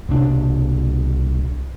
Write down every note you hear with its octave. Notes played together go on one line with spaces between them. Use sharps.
C2 B2 D4